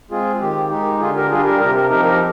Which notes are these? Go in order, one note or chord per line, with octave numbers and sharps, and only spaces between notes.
G#3 C4 F4 G#4
D#3 G4
G#3 D#4 G4
D3 F4 G#4
G4 A#4
G3 D4 F4 G#4
G4 A#4
C3 G4 A#4
G4 A#4
F3 C4 D#4 G4 A#4
G4 A#4